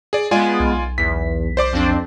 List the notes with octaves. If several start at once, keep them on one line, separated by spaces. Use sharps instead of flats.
G#4 D5
G#3 B3 F4 D5 G#5
B1
E2 B6
C5 D5 D6
F2 C4 D4